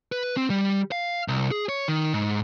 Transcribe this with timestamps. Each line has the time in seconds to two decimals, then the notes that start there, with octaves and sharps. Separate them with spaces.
0.12 B4
0.37 C4
0.50 G3
0.92 F5
1.28 C2
1.51 G#4
1.69 C#5
1.88 D#3
2.14 G#2